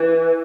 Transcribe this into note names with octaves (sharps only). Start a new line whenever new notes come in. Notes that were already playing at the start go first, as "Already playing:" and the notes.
Already playing: E3